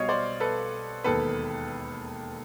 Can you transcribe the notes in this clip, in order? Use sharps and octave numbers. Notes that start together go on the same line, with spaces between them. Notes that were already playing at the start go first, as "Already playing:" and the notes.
Already playing: B1 B2 G3 C#5 D#5 F5
C5 D5
A4 B4
E1 D#2 D#3 A4 B4